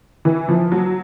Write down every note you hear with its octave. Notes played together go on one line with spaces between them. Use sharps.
E3
F3
F#3